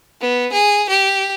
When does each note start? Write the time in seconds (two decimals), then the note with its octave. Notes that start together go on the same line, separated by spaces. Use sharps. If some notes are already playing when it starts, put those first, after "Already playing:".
0.21 B3
0.52 G#4
0.89 G4